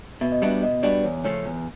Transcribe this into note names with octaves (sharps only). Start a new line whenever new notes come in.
B2 E5
D#5
G3 B3 D4 F#4 E5
B2 D#5
G3 B3 D4 F#4 D5
E2 C#5
C#3 F3 A3 C#4 C#5
E2